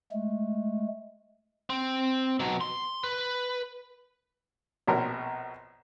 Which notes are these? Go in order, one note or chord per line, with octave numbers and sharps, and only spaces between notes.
G#3 A3
C4
B2 F#3
C6
B4
A#1 B2 C4 A#4 C#5 C6